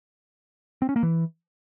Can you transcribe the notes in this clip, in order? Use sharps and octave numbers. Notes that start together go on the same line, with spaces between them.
C4
C#4
A#3
E3